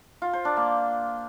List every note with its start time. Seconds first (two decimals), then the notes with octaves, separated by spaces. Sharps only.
0.22 F4
0.33 C5
0.45 D4
0.57 A#3